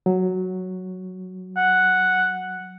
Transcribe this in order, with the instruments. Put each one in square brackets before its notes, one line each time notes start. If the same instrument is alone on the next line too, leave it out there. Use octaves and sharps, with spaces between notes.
[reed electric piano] F#3
[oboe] F#5